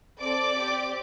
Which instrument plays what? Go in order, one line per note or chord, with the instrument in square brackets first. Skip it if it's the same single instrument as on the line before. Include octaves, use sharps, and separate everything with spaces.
[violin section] C4 A4 D5 D6
C4 G4